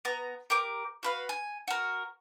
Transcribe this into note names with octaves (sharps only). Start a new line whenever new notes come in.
B3 A#5
G4 A#4 D6
F#4 B4 F5
G#5
F#4 A#4